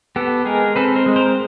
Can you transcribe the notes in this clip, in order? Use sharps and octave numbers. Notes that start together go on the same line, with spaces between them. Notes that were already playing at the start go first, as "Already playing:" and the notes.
B3 G4 A4
G#3 G#4 A#4
C4 A4 B4
A#4 C5
G#3
A#4 C5